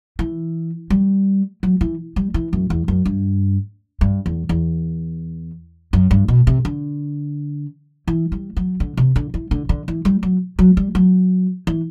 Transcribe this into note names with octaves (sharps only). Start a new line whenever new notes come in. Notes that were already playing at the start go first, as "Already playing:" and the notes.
E3
G3
F#3
E3
G3
E3
F#2
E2
F#2
G2
G2
E2
E2
F#2
G2
B2
C3
D3
E3
G3
F#3
D3
C3
D3
E3
D3
D3
E3
G3
F#3
F#3
G3
F#3
E3